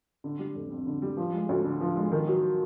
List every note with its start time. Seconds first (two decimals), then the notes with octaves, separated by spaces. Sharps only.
0.24 D3
0.39 G3
0.55 F1
0.70 F2
0.87 D3
1.02 G3
1.17 F3
1.34 G#3
1.49 D2
1.64 D3
1.80 F3
1.96 G#3
2.12 D#3
2.28 F#3